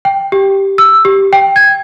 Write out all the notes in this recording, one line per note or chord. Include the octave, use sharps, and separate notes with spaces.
G5
G4
E6
G4
G5
G#6